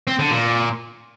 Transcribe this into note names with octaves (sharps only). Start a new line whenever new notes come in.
C4
D3
A#2